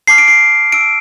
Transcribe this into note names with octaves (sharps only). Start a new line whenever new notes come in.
A5 D6 F6 C7
D7
C7
A5 E6 D7